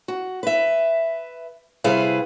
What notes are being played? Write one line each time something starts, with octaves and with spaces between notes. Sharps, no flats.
F#4
B4 E5
C3 G3 E4 G#4 B4 F5